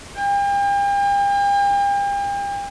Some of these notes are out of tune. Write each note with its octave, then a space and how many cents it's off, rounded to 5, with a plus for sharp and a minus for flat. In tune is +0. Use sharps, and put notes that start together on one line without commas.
G5 +40